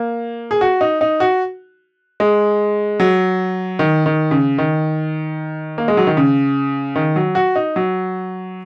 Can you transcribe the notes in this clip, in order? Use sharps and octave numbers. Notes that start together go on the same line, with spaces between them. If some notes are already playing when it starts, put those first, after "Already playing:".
Already playing: A#3
G#4
F#4
D#4
D#4
F#4
G#3
F#3
D#3
D#3
C#3
D#3
A#3
G#3
F#3
D#3
C#3
D#3
F#3
F#4
D#4
F#3